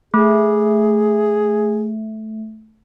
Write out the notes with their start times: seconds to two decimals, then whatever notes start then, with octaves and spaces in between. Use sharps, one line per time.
0.14 A3 G#4